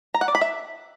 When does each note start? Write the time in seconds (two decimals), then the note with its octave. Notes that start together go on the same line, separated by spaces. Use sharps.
0.14 A#5
0.21 F#5
0.28 D5
0.35 B5
0.41 E5